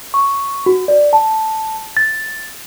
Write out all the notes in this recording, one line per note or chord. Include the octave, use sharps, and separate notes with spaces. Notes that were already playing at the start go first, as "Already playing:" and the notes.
C#6
F#4
D5
A5
A6